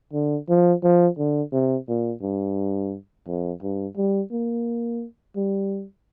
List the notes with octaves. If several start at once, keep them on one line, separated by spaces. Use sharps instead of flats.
D3
F3
F3
D3
C3
A#2
G2
F2
G2
G3
A#3
G3